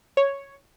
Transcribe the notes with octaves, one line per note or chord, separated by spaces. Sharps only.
C#5